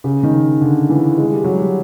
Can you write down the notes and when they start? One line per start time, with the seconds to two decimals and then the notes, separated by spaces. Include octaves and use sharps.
0.04 C#3
0.23 D#3
0.61 D3
0.90 E3
1.18 G#3
1.31 G3
1.44 F#3
1.58 G3